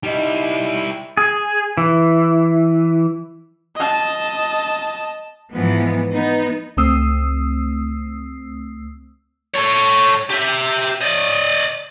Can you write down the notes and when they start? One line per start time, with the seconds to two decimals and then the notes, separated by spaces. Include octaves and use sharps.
0.03 G3 D#4 E4 D#5
1.17 G#4
1.78 E3
3.76 D#5 A5
5.53 G#2 E3 F3 B3
6.11 B3 D#4
6.77 C#2 A3 C4 D#6 E6 C7
9.55 A4 C#5
10.30 G4 E5
11.02 D5 D#5